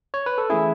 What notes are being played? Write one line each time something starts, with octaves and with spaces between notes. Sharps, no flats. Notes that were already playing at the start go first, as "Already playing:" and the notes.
C#5
B4
A4
E3 A3 C#4 E4 G#4